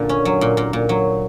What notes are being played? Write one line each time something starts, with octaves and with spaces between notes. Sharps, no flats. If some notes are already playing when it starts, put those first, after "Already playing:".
Already playing: F#2 A#2 D3
C#4
F#3
A#2
A#2
A#2
F#3